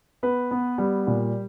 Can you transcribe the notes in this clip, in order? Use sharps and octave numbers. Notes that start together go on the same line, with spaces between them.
B3 B4
B3
G3
A#2